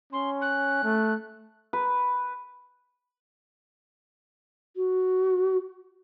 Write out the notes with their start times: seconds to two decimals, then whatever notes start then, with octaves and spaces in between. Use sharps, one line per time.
0.13 C#4 C6
0.42 F#6
0.84 A3
1.73 B4
4.76 F#4